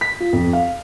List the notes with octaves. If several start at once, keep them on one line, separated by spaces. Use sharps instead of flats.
B6
F4
F2
F5